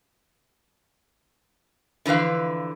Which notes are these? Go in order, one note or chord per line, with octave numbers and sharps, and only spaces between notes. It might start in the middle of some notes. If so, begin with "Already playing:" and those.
D3 E3 F3 B4 F5